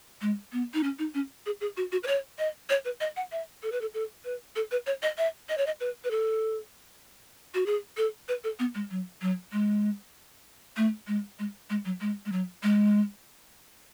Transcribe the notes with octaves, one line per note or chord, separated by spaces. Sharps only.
G#3
B3
D#4
C#4
D#4
C#4
G#4
G#4
F#4
F#4
B4
C#5
D#5
C#5
B4
D#5
F#5
E5
A4
B4
A4
A4
B4
A4
B4
C#5
D#5
E5
D#5
C#5
D#5
B4
B4
A4
F#4
G#4
A4
B4
A4
B3
G#3
F#3
F#3
G#3
A3
G#3
G#3
G#3
F#3
G#3
G#3
F#3
G#3